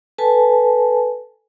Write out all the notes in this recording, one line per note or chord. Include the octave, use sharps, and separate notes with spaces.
A4 B4 G#5 A5